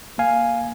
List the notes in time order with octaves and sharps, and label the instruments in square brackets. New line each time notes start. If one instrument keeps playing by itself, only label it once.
[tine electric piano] A#3 F5 G#5